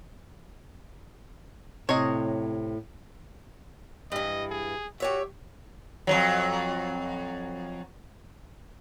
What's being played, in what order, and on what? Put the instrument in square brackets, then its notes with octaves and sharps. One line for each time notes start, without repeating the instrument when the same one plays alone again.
[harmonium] A2 [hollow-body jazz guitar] C3 [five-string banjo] C#5 D#5
[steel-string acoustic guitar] G2 E3 [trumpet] D#5
[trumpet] G#4
[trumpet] F#4 [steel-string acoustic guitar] G4 C#5 E5
[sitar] F2 G#2 F#3